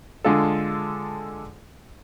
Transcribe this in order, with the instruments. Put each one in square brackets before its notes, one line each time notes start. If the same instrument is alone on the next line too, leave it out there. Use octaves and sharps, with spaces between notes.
[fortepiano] D3 G#3 F4 A4